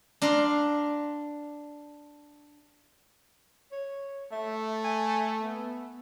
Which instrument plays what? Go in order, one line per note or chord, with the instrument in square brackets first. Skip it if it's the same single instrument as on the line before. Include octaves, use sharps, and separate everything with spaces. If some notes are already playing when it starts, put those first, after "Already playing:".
[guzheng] D4 F5 A#5 C6
[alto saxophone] C#5
[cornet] A3 [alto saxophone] E5
[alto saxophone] G#5
B3